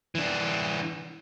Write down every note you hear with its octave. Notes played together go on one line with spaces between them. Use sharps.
E3 D4